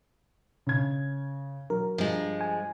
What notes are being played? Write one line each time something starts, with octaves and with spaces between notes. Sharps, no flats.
C#3 G#6
F#3 A#4
G2 F3 G#3
G#5